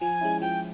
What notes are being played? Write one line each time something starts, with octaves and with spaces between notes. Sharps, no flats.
F3 G#5
G#3 C#4 E4
F3 G5